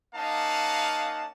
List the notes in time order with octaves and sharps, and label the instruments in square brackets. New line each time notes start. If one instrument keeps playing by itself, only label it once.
[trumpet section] A#3 C#4 D#4 F5 F#5 A5